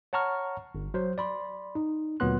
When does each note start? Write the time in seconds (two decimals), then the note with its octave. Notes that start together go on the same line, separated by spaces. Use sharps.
0.13 C#5 F#5 A5 A#5 C#6 F6
0.75 G1
0.94 F#3 C5
1.18 D5 B5 C6
1.75 D#4
2.20 D2 A#2 F#3 B3 C6 F#6